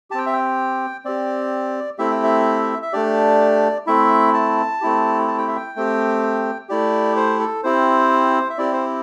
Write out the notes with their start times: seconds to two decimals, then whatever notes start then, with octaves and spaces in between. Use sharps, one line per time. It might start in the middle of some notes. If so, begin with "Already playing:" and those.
0.11 G4 A5
0.14 C4 G5
0.26 E5
0.33 G5
1.05 C4 G4 D5
1.98 A3 C4 E4 G4 E5
2.11 G5
2.24 E5
2.82 E5
2.93 A3 D4 G4 D5
3.87 A3 C4 E4 E5
4.34 A5
4.81 A3 C4 E4 G4
5.28 A5
5.38 G5
5.48 E5
5.56 G5
5.76 A3 C4 G4
6.69 A3 E4 G4 D5
7.16 C5
7.40 A4
7.63 C4 E4 G4 C5
8.50 E5
8.58 C4 E4 G4 D5
8.73 C5